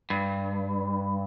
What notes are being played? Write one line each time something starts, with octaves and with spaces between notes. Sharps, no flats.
G2